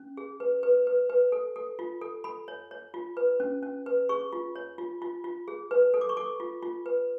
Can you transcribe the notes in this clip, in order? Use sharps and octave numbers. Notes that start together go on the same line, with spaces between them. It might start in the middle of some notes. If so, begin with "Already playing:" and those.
Already playing: C#4
G#4
B4
B4
B4
B4
A4
A4
F4
A4
A4 B5
C#5
C#5
F4
B4
C#4
C#4
B4
G#4 C#6
F4
C#5
F4
F4
F4
G#4
B4
A4
D6
C#6
A4 D6
F4
F4
B4